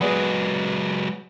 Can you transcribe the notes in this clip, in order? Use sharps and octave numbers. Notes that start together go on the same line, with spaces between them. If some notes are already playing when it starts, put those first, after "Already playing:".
F#3 G#3 B3 G#4 D5